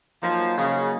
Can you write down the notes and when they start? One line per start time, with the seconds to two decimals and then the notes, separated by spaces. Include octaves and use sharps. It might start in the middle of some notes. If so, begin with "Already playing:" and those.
0.23 F3 F#3 A#3 D#4
0.57 C#3